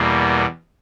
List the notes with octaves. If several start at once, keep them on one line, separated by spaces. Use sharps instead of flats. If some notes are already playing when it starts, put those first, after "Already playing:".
Already playing: E2 B2 G3 A#3